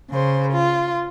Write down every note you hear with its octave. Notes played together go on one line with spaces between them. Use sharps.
C#3 C5
F4